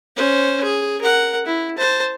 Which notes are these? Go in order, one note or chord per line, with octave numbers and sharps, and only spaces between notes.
C#4 C5
G#4
A#4 F#5
E4
C5 A5